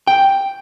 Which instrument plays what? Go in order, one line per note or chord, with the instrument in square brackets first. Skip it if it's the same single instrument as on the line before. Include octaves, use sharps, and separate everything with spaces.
[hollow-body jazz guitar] G5